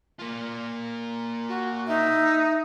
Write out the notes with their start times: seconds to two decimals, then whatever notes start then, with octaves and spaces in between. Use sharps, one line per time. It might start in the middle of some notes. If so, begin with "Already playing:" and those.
0.19 A#3 F4
1.49 F#4
1.88 D#4 E5